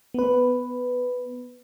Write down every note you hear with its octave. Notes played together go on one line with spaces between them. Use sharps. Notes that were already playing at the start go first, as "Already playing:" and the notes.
B3 B4